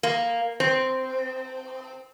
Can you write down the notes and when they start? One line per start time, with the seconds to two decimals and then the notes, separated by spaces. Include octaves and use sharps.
0.03 A#3
0.60 C4